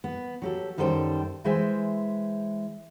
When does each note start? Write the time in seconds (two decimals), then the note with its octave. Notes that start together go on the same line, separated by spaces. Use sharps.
0.04 B3
0.42 F#3 G4 A4
0.78 F#2 D#3 G3 A4 C5 G5
1.44 E3 G#3 C5 E5 G5 G#5